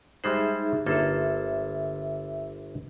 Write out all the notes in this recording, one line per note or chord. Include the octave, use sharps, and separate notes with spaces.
G3 G#3 D#4 G#4 C5 E5
G1 A#3 A4 E5